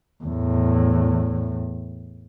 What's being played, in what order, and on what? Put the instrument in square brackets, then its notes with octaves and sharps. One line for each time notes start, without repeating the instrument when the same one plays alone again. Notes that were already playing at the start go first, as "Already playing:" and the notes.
[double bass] E2 A2